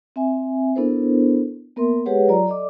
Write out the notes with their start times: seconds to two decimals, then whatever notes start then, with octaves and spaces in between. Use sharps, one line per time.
0.16 C4 E5 G#5
0.76 B3 D4 E4 A4 A#4 C5
1.76 A#3 B3 A#4 E5 C6
2.06 G#3 G4 G#4 B4 C#5 F#5
2.28 F#3 F4 D5 A#5
2.46 A4 D5 D#5 D6